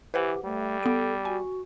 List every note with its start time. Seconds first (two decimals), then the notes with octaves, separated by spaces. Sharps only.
0.14 E3 G4 B4 C5 F#5
0.45 G3 A3
0.83 B3 A4 D7
1.25 F#4 G#5